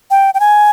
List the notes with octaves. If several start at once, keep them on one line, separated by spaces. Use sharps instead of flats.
G5
G5
G#5